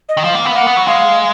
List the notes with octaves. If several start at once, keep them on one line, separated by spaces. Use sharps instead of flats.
D#5
D#3
F3 F5
A#3
B3
A#3 F#5
B3
F#3
G#3 F5